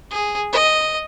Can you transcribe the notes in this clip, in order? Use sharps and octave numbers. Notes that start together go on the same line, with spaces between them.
G#4
D#5